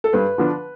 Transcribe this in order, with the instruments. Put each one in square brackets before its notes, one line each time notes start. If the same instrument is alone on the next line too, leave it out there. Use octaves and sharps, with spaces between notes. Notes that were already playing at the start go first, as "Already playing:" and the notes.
[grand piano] A4
[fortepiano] G2 [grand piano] B4
[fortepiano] D3 F3 B3 D4